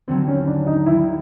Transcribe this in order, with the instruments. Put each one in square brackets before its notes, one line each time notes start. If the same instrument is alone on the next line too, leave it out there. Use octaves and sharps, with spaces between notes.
[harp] D#2 D3 F#3 [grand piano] C4
[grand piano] C#4
D4
D#4
[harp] D#2 D3 F#3 [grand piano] E4